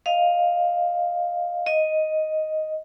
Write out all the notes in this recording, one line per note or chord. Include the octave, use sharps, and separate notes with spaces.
D#5 F5
D#5